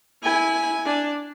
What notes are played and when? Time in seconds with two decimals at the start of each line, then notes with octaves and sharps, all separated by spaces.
0.23 E4 G#5
0.85 D4